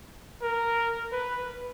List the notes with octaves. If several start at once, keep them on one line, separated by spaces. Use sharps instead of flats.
A#4
B4